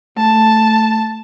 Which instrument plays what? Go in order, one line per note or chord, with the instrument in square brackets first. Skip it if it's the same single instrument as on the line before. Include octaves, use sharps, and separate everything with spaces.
[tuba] A3 [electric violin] A5